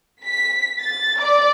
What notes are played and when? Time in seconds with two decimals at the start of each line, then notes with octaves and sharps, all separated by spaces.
0.23 B6
0.80 A6
1.20 D5